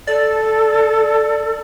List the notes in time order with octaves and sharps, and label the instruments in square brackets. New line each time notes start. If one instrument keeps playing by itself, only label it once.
[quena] A4 [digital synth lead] D5